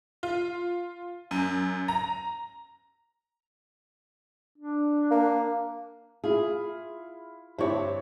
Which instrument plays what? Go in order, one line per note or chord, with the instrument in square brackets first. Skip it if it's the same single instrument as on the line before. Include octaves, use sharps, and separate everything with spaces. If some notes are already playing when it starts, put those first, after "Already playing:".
[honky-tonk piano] F4
F#2
A#5
[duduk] D4
[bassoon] A#3
[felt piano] E4 F4 F5 [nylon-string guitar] G#4
[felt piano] G2 A5 C#6 [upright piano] C4 C#5 [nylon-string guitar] E4 G4